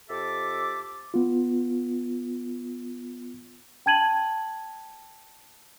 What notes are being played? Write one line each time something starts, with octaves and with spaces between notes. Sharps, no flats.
F2 G4 A4 E5 D6
B3 F4
G5 A5 G#6 D#7 F#7